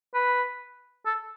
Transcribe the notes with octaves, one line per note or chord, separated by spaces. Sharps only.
B4
A4